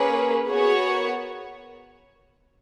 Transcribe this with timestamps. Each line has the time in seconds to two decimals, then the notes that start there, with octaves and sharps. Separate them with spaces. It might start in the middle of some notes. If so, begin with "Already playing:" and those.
Already playing: A#3 C#4 G#4 B4
0.10 A#4
0.47 B3 F#4 G#4 C#5
0.84 A#4